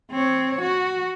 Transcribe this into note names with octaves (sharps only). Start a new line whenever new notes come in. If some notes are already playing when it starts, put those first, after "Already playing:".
C4 C#5
F#4